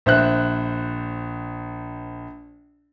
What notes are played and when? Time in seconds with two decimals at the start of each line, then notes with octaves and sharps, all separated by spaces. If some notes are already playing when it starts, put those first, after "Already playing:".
0.06 A#1 C5 E5 F#6